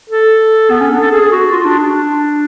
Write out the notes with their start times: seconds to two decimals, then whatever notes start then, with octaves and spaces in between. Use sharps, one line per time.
0.10 A4
0.70 B3
0.81 C#4
0.91 D4
1.01 A4
1.12 G#4
1.31 F#4
1.52 F4
1.65 D4
1.80 D4